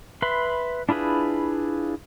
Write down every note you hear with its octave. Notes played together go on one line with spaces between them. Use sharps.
B4 E5 B5 C6
D4 E4 F4 G#4 B4